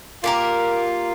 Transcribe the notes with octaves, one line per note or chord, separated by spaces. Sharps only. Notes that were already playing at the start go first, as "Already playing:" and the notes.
A#3 F4 G4 A#4